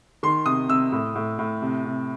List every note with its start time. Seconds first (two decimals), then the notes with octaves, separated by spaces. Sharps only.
0.23 D#3 C6
0.46 C3 D#6
0.69 C3 E6
0.92 A2
1.15 A2
1.39 A2
1.62 C3
1.85 C3